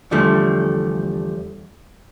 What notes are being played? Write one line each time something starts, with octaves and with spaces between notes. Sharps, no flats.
E2 D3 F3 G3 A3